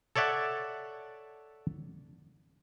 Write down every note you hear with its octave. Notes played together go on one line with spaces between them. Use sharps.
A4 C#5 D5 E5 F#5